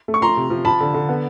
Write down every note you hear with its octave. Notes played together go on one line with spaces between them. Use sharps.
A3
C#6
F3 A#5 C6
C3
F3
F3 A5 B5
D3
D3
B3